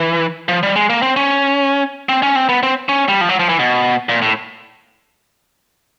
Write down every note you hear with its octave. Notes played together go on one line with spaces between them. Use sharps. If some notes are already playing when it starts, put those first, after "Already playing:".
Already playing: E3
F3
G3
G#3
A#3
C4
C#4
C4
C#4
C4
B3
C4
C#4
G3
F3
F#3
F3
E3
B2
A#2
A2